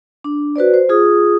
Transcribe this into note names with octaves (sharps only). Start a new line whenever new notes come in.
D4
F#4 B4 C5 D5
C5
F4 G#4 D#6